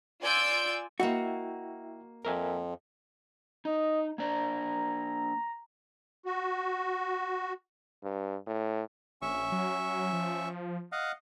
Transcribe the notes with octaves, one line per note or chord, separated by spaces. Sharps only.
F4 D5 G#5 E6 G6 D7
A#3 E4 F#4 D#5 E5 F#5 G5
F2 A#4 E5 G#5
D#4 D#5
A#3 D4 D5 A#5
F#4
G2
A2
A#1 C#4 E5 C#6
F#3
F3
D#5 F5 F#5